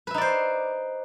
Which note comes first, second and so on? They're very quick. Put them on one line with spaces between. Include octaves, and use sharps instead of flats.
B4 E5 D#4 D5 C5